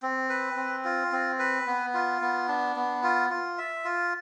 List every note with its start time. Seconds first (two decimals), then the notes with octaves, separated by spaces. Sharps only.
0.02 C4
0.29 B4
0.56 C4
0.85 F4
1.12 C4
1.39 B4
1.67 B3
1.94 F4
2.21 B3
2.48 D4
2.76 B3
3.03 F4
3.30 F4
3.58 E5
3.84 F4